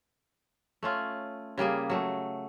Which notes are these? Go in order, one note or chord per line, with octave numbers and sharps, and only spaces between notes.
A3 C#4 F4
C#3 G3 A#3 G#4
F#3 A3